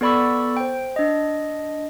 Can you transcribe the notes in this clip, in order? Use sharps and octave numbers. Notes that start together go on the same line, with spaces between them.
B3 A4 D5 B5 C#6 E6
C5 G5
D4 D#5